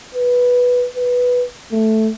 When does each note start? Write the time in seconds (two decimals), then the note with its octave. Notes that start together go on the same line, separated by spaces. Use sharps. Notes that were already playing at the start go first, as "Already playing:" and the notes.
0.14 B4
0.96 B4
1.72 A3